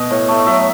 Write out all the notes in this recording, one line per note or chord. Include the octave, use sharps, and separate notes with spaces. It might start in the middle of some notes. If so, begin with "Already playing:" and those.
Already playing: B2 D#5
A2
A3
F#3 E5